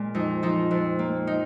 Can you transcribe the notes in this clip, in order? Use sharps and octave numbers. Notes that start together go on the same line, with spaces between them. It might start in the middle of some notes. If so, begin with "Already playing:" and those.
Already playing: A#2 G#3
F2 D#4
F3 D#4
F2
A#3
D#4